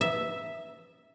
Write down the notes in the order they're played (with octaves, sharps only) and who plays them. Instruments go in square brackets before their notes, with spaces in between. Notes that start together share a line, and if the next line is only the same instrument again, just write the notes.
[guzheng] E5